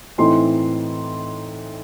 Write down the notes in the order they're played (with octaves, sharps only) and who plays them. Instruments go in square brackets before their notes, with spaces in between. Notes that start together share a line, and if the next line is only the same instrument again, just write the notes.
[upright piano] A2 E3 A3 C4 D#4 C6